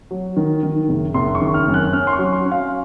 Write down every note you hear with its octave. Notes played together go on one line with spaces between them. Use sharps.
F#3
D#3
D#3
F#1
F#1 C6
C#6
D#3
F6
F#2
F#6
C#4 F6
C6
C#6
F#3
C6
C#4
F5